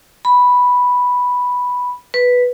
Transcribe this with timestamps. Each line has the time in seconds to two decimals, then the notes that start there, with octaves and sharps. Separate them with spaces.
0.25 B5
2.14 B4